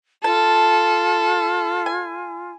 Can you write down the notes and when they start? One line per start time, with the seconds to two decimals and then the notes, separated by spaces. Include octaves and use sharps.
0.24 F4 A4 A5
1.86 G#5